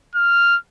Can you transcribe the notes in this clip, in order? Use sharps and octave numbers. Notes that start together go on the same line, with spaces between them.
F6